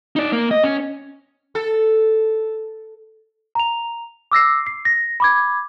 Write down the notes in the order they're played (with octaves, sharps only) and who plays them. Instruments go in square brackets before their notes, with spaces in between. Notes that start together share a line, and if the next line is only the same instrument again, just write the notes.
[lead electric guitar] D#4 D5
A#3
D#5
C#4
[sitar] A4
[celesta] A#5 F7
D6 E6 A#6 C7
C7
A#6
B5 D6 G#6